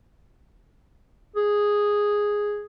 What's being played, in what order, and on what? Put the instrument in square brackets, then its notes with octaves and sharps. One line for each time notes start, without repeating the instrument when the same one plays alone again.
[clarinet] G#4